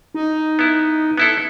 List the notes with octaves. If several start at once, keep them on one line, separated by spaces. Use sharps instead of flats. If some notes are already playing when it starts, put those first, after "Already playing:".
D#4
B3 E4
B3 E4 A4